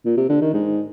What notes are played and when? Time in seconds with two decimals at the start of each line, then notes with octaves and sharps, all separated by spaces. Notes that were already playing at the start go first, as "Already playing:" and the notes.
0.05 A#2
0.17 C3
0.29 D3
0.41 D#3
0.53 G#2